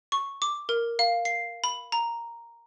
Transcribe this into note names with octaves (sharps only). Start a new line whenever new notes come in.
C#6
D6
A#4
F5
C7
B5
A#5